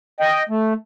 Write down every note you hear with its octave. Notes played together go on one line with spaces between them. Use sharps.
D#5 G5
A3